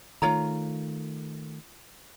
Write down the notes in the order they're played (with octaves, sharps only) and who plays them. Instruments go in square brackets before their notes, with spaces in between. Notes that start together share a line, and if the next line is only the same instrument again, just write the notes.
[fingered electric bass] D#3 A3 [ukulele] F4 C#5 A#5